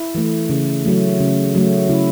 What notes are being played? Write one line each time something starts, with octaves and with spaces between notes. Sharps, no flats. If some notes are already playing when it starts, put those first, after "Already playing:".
Already playing: E4
E3 A3
C#3
F#3 A3
C#3
F#3 A3
C#3 E4